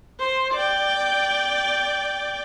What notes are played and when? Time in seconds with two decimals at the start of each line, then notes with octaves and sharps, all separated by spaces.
0.20 C5
0.53 D5 G5